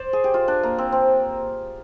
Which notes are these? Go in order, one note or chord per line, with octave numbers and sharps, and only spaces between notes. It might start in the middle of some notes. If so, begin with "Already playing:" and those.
Already playing: C5 D5
G#4
G4
F4
D4
A#3
C4
C4